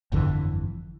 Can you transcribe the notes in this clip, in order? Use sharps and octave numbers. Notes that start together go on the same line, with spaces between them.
G1 F2 D3 E3